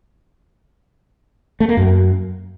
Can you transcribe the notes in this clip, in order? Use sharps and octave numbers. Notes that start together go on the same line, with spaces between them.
A3
A#3
F#2